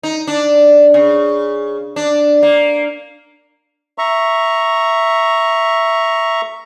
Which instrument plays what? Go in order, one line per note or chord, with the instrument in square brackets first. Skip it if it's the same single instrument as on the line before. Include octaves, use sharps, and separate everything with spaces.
[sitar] D#4
D4
C#3
D4
A#3
[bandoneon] E5 A#5 C#6